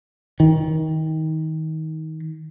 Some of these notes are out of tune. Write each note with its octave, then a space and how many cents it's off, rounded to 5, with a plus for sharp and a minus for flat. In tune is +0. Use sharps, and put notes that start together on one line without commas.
D#3 +25